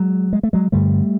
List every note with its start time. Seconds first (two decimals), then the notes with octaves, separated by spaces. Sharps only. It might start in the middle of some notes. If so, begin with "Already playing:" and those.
Already playing: F#3 G#3
0.33 G#3
0.43 A3
0.53 F#3 G#3
0.72 G2 D3 G3 A3